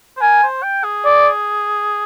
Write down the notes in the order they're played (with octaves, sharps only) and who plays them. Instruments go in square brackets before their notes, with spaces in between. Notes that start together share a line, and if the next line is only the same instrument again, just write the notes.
[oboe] C5
[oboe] A#4 [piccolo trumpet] G#5
[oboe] C5
G5
G#4
[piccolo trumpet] D5